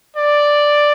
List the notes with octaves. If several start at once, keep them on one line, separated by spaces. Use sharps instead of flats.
D5